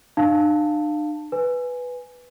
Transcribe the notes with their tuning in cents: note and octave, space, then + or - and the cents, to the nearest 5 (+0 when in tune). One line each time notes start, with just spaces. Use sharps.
D4 +45 F5 +0 A5 +10
B4 +0 G#5 +0